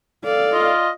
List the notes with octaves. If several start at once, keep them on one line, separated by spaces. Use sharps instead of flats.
A4 D5 F5
F4 D#5